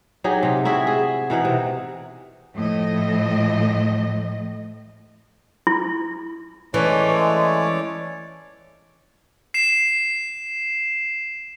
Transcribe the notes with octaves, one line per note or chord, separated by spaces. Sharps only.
F#3 D#4 G4 G#4
C3 G4
E4 F#4 G#4 E5
G#4
B2 E3 D#4 F#5
C3
A2 F3 D#5
E4
E3 G#3 A3 C#4 C#5 D5
C7 E7